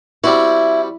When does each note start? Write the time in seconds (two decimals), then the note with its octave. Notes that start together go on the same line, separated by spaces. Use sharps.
0.24 G3 C4 E4 F#4